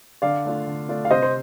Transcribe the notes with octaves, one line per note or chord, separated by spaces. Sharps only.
D3 D5 F5
A3 D4 F4
D3
A3 D4 F4
F5
C3 C5 D#5
C5